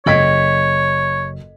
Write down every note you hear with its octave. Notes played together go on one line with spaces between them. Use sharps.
F#1 A4 C#5 D#5 G5 G#6 B6